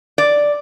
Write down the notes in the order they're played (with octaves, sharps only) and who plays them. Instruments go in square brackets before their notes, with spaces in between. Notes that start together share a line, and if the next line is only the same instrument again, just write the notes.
[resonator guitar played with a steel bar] D5